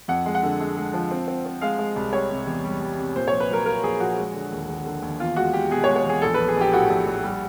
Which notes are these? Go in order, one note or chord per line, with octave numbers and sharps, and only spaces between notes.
F2 F#5
G#3
F#5
D3
G#3
G#3
F3
C4
C4
C4
G#3 F5
G#3
C2
G3 C#5
C3
E2
G3
G3
C3
A#2 C5
A#1 C#5
B4
F#3 A#4
A#3 A#4
A#1 G#4
A#1 F#4
G#3
D3
D#2
D#2
D3
D#2
E2 F4
G#3 F#4
G#3 G4
B2 G#4
C#5
G#3
C#5
E2 G#4
A#1 A4
B4
A#1
G#4
A#1 G4
A2 F#4
A#1
A#1
G3